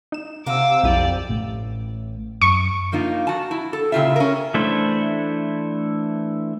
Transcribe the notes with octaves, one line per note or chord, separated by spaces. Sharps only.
D#4 E7
C3 F5 F#5 A#5 D6 E6
B1 F2 E4 G4 D5 D#7
A1 A2
F#2 C#6
F3 A#3 D#4 F4
F#4 A5
E4
A4
A#2 C#3 E4 F4 G4 E5
C#4 A#4
E3 A3 D4 E4 C5